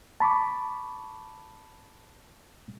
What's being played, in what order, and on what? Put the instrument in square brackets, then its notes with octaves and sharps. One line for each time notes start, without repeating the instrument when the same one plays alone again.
[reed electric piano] A5 B5 C#6 D6